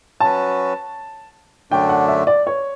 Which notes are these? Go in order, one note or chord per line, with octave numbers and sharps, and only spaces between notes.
F#3 C#4 F#4 B4 A5
F#2 D3 A3 D4 G5
F#5
E5
D5
C#5